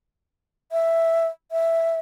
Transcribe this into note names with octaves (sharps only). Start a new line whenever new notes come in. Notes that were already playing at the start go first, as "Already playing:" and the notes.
E5
E5